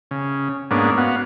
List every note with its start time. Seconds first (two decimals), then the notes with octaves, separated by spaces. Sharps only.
0.11 C#3
0.71 G#2 A#3 B3 C#4 D4
0.97 B3 F#4 F5